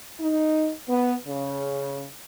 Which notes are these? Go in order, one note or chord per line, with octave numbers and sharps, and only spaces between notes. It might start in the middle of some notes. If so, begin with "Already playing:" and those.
D#4
B3
C#3